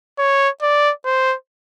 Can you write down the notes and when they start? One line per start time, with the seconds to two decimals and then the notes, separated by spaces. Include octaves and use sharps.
0.19 C#5
0.62 D5
1.05 C5